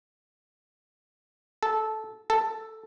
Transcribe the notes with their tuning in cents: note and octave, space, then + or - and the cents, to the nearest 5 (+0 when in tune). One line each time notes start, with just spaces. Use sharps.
A4 -15
A4 +0